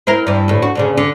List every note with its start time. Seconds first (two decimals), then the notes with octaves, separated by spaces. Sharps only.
0.07 C4 E4 A#4
0.27 G2 E3
0.48 D2 A2
0.62 F#4
0.75 D2 A#2 C#3
0.97 D3